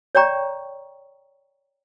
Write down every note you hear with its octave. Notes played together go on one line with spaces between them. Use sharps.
C#5 D5 G5 A#5 C#6